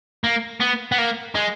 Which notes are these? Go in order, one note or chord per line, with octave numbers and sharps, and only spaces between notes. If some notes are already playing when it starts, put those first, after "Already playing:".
A#3
B3
B3
A#3
G#3